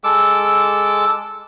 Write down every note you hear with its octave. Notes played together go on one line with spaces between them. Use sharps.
G#3 A4 D6 E6